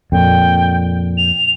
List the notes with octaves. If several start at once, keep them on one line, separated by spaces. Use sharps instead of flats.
F2 A#2 G5
F7